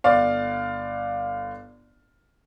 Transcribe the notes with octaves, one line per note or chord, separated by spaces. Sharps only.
G1 D5 F5